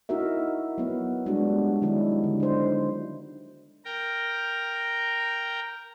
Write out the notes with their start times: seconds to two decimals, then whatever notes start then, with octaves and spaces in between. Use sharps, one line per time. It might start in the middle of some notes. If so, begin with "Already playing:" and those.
0.09 D#4 E4 F#4 A#4 E5
0.78 F#3 B3
1.26 G3 G#3 B3 D4 F#4
1.82 D#3 F#3 G#3 D#4 E4
2.24 D3
2.40 D#4 C5
3.85 A#4 G5 A#5